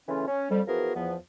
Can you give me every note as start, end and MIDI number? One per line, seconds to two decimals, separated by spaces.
0.09 0.26 49
0.09 0.26 52
0.09 0.26 57
0.09 0.26 61
0.09 0.26 65
0.27 0.46 61
0.51 0.62 41
0.51 0.62 55
0.68 0.92 52
0.68 0.92 53
0.68 0.92 59
0.68 0.92 66
0.68 0.92 68
0.68 0.92 70
0.95 1.16 40
0.95 1.16 53
0.95 1.16 59